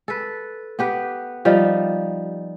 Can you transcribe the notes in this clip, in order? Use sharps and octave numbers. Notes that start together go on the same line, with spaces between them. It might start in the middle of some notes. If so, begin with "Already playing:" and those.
A4 B4
B3 G4 B4
F3 G3 D#4